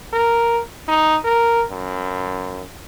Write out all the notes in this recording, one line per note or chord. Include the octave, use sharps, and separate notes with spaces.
A#4
D#4
A#4
F#2